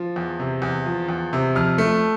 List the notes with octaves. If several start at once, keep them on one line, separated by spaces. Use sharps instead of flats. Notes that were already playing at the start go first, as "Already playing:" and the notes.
Already playing: F3
E2
C3
E2
F3
E2
C3
F2 F6
A3